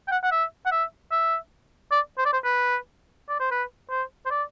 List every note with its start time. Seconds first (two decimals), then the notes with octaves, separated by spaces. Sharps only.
0.08 G5
0.11 F#5
0.24 F#5
0.32 E5
0.66 F#5
0.72 E5
1.11 E5
1.92 D5
2.18 C5
2.25 D5
2.33 C5
2.44 B4
3.29 D5
3.40 C5
3.51 B4
3.91 C5
4.26 C5
4.31 D5